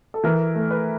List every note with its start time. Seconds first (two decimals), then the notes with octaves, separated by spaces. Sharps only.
0.14 A4
0.24 E3 A#4
0.55 A3
0.71 B4